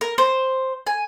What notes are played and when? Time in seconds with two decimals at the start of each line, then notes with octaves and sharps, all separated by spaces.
0.01 A#4
0.18 C5
0.87 G#5